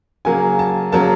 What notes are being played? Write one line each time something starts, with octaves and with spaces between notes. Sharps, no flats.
C#3 F#3 A#3 G#5
A5
C#3 F#3 A#3 A5